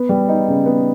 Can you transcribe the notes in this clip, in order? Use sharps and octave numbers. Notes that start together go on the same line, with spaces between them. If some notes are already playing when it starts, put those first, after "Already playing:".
Already playing: B3
G3
D#4
C#3
B3